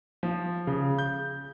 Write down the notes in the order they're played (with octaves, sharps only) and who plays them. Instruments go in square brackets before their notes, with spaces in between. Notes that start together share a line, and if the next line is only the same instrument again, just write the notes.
[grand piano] F3
C#3
G6